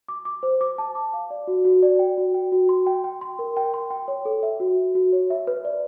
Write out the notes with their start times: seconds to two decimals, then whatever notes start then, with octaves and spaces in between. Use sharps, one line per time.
0.08 D6
0.25 D6
0.43 C5
0.61 D6
0.78 A5
0.95 D6
1.13 F5
1.30 D5
1.47 F#4
1.65 F#4
1.83 D5
1.99 G5
2.18 F#4
2.34 G5
2.52 F#4
2.69 C6
2.87 G5
3.04 G5
3.21 C6
3.39 A#4
3.57 G5
3.74 C6
3.90 G5
4.08 C#5
4.25 A4
4.43 E5
4.60 F#4
4.78 F#4
4.95 F#4
5.13 C#5
5.30 E5
5.47 B4
5.65 D5